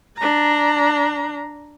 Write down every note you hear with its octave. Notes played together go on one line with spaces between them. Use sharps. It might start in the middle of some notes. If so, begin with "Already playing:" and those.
D4 A#5